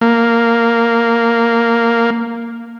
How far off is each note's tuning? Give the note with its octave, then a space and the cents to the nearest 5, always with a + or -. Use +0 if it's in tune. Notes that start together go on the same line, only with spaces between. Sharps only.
A#3 -5